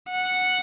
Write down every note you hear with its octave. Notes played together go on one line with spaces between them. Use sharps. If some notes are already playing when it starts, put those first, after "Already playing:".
F#5